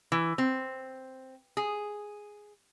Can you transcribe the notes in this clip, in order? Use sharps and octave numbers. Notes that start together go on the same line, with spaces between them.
E3
C4
G#4